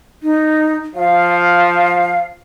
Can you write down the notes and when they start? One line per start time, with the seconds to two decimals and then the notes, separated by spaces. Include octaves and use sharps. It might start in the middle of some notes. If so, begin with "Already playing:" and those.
0.23 D#4
0.95 F3 F5